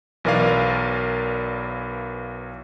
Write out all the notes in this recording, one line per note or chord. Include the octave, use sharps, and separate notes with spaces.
B1 E3 A#4 D5 F5